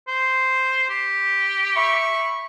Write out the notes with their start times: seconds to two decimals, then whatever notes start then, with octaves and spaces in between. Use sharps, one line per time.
0.08 C5
0.89 G4
1.76 E5 B5 C#6